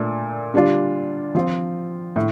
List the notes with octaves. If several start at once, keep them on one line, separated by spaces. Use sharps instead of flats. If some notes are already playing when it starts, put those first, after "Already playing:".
Already playing: A#2 A3 D4
D3 G3 D4 F4
F3 C4 F4
A2